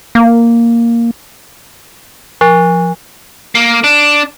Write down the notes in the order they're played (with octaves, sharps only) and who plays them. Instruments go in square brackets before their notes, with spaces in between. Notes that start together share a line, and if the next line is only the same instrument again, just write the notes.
[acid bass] A#3
[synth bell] F3
[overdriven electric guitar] A#3
D4